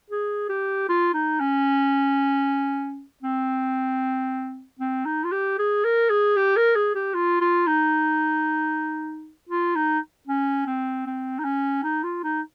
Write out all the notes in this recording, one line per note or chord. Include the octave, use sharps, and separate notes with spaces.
G#4
G4
F4
D#4
C#4
C4
C4
D#4
F4
G4
G#4
A#4
G#4
G4
A#4
G#4
G4
F4
F4
D#4
F4
D#4
C#4
C4
C4
D#4
C#4
D#4
F4
D#4